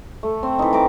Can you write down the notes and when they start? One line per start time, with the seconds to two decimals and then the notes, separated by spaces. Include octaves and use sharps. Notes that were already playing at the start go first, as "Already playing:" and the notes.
0.23 A3
0.43 C4
0.59 E3 D#4
0.73 E3 G5 A#5 D6